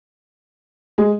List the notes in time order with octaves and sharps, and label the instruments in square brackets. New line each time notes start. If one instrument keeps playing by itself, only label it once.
[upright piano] G#3 G#4